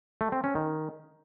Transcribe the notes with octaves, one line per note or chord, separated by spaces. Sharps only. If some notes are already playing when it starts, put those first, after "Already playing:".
A3
C4
C#4
D#3